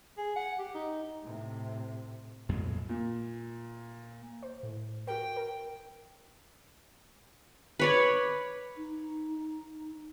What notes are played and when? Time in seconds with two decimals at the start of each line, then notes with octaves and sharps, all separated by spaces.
0.17 G#4
0.36 F#5
0.59 G4
0.75 D#4
1.23 A2 C3
2.49 B1 F2 A#2 G#3
2.89 A#2
4.43 C5
4.63 A2
5.07 F#4 A#4 G5
5.36 A#4
7.79 B4 C#5 D5
8.76 D#4